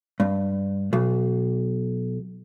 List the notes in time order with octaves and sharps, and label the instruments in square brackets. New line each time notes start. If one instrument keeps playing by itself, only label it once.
[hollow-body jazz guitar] G2
B1